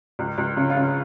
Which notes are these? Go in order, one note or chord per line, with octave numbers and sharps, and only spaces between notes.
C#2
C#2
C#3
F4
C#3